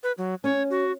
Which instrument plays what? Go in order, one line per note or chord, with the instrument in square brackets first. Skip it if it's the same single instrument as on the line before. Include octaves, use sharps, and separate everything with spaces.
[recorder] B4
F#3
[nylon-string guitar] C#4 [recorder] C#5
[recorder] F#4